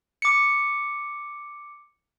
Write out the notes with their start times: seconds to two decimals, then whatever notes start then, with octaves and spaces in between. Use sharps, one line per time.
0.22 D6 C#7